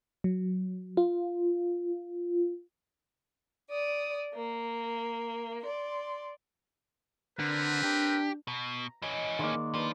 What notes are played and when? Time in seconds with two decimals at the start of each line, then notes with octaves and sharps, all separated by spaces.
0.24 F#3
0.97 F4
3.69 D5 D#6
4.34 A#3
5.63 D5 C6
7.39 D3 C4 A#4 B4
7.83 D4 G4
8.47 B2 A#5
9.02 E3 C#4 D#5 D6 E6
9.39 D#3 G#3 A#3 D5
9.74 F3 D4 B4